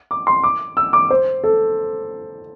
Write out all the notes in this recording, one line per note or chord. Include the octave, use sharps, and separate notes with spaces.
D6
C6
D6
E6
D6
C5
A4